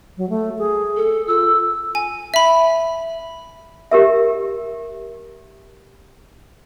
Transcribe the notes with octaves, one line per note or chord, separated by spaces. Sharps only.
F#3
A3
G#4
A4
F4 E6
G#5
E5 B5
G4 A#4 E5